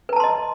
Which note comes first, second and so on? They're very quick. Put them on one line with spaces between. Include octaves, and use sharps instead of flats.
B4 A#5 A5 C6 D#5